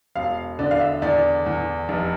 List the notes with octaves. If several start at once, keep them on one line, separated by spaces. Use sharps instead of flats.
E1 F5
D3 D5
F5
E5
E2 D5
E2
F1